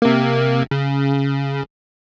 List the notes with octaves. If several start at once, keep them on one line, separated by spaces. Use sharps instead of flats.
C3 A#3
C#3